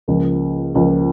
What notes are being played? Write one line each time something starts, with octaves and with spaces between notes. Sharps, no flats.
C#2 C#3 F3 A#3
C#2 C#3 F3 A#3